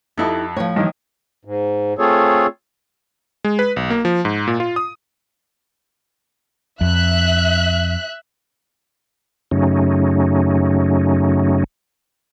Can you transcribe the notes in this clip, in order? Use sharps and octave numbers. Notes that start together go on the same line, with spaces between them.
F2 D#4 E4 G4 A4 D#5
A2 F3 C#5
G2 D#3 E3 A#3
G#2
A3 C4 F4 G#4 A4 C#5
G#3
B4
B1
A#3
F3
G#2
A#2
F4
D#6
F2 E5 F#6
F#2 C#3 F#3 A3 C#4 D#4